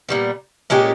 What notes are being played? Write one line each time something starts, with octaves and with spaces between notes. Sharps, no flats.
A#2 G3 B3
A#2 G#3 C#4 G4